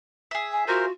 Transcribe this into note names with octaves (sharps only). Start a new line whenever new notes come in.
G#4 E5
G#5
F4 F#4 A#4 C5